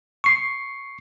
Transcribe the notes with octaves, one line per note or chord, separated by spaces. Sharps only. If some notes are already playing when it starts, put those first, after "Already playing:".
C#6 C7